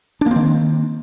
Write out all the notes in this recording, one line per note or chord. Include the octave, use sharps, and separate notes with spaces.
D#3 A#3 C4 D4